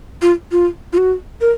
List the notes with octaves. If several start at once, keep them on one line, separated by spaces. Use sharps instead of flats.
F4
F4
F4
F#4
A#4